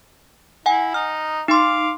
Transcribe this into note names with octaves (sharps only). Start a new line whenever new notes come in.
E4 F#5 G#5
D#4 F6
D#4 F5 C6 D6